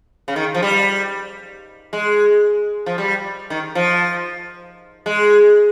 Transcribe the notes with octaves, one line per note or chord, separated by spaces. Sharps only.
C#3
D#3
F3
G3
G#3
F3
G3
D#3
F3
G#3